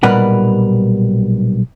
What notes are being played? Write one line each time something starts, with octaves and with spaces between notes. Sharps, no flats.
B1 A#2 G3 A#4 B4 F#5